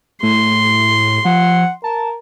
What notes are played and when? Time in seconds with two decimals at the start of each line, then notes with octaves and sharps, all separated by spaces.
0.23 A2 C6
1.25 F3 F#5
1.84 A#4 A5